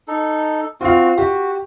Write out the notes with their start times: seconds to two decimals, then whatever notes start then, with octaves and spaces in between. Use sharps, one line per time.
0.08 D#4 A4
0.81 C4 F4 F#4 F5
1.18 F#4 G4